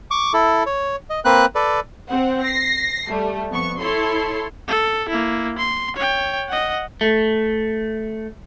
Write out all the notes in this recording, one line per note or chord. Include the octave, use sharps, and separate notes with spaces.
C#6 D6
E4 A4
C#5
D#5
A#3 C4 B4 F#6
A4 B4 D5
C4 C5 F#5
A#6 C7
G3 A3
F2 B3 C#6
E4 A4 C#5 C6
A4
A#3 E4
C6
C#5 G5
D#5 F#5
A3